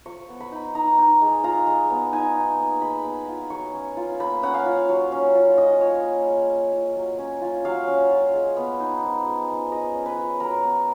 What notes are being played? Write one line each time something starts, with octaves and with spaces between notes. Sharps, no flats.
F3 C#6
B3
B5
D#4
D#4 A#5
D#4
G#3
F4 A#5
G#3
B3
D#4 G#5
D#4
A#3
G#3 B5
B3
F4
F#3 C#6
C#4
F4
A#3 B5
C#4 F#5
F5
F4
F#3
C#4
F4
F4 D#5
F4 C#5
A#3
G#3
C#4
F4
F#3
C#4
F4
F#3 F5
C#4
F4
G#3
B3
D#4
F3
G#3
D#4
G#3 D#5
C#4
B4
F4
F#3 A#4
B3